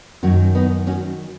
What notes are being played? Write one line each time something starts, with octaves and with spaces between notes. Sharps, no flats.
F#2 D#3 F#3 C#4 F#4
B3 D#4
C#4 F#4